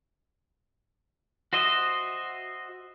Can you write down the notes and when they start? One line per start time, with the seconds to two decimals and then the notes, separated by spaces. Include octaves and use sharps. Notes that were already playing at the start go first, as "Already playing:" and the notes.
1.53 F#4 C5 D#5 E5